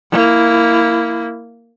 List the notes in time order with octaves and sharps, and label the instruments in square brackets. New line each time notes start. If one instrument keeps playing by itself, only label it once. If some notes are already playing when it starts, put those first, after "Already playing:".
[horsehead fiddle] A#3 E4